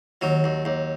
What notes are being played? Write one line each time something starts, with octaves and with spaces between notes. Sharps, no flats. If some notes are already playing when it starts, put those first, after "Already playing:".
D#2 F#3
D#2
D#2